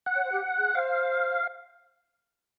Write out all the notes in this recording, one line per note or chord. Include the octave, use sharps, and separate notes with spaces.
F#5
C#5
C5
G4
G#4
C5 F5